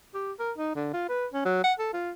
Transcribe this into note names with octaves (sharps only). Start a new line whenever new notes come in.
G4
A#4
D#4
D3
F4
B4
C#4
F#3
F#5
A4
F4